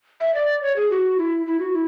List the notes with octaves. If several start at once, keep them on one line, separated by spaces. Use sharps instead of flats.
E5
D5
C#5
G#4
F#4
E4
E4
F#4
E4